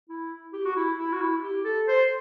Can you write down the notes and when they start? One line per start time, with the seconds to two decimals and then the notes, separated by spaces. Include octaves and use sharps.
0.09 E4
0.53 G4
0.65 F#4
0.76 E4
0.99 E4
1.13 F#4
1.21 E4
1.42 G4
1.64 A4
1.88 C5